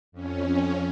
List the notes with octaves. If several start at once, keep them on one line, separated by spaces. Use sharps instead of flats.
F2 C#4